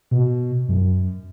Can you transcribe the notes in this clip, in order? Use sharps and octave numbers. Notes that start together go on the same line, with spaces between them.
B2
F#2